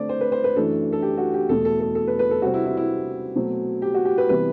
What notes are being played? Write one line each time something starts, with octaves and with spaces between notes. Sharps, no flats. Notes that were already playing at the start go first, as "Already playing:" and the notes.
Already playing: D3 A3 C4 D5
C5
B4
C5
B4
F#2 E3 A3 D4 A4
A4
G4
F#4
G4
E2 B2 A3 A4
A4
A4
A4
B4
B4
A4
C3 G3 C4 F#4
E4
E4
E4
B2 F#3 A3 C4
G4
F#4
G4
B4
C3 E3 G3 B3 B4